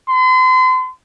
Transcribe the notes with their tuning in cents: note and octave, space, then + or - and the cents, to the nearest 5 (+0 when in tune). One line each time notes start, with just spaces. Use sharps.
C6 -40